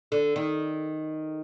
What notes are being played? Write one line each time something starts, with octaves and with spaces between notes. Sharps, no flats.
D3
D#3